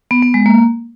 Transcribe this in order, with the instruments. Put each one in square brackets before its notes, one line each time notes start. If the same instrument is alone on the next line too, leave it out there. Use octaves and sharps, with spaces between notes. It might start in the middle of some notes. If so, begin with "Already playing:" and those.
[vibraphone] B3
B3
G#3
A#3